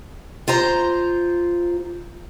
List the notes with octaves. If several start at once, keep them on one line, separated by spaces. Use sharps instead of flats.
F4 C5 A#5